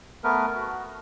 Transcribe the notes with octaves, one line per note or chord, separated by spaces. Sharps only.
A3 B3 A#4 B4
F#4